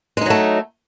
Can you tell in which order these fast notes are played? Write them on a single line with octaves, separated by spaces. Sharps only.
G#3 D#4 F#3 A3